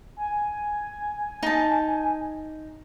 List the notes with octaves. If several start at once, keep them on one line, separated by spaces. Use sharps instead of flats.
G#5
D#4 A5